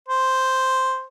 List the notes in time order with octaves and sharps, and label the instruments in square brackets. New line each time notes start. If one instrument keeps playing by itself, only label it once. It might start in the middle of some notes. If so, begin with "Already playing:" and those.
[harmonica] C5